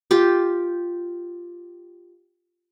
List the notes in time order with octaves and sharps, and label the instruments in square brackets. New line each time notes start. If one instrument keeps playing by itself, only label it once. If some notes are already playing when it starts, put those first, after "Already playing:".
[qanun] F4 G4